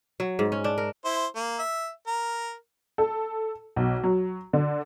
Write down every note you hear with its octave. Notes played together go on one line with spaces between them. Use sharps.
F#3
G#2
C#4
D4
A#4
E4 C5
A#3
E5
A#4
A4
B1
F#3
D3